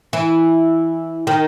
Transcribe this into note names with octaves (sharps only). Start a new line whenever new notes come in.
E3
D#3